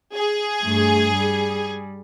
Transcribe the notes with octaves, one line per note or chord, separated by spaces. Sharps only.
G#4
G2 A3
G3